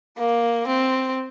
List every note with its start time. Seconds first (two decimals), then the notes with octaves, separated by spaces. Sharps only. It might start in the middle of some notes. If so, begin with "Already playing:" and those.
0.18 A#3
0.67 C4